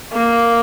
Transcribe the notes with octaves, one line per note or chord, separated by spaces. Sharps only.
A#3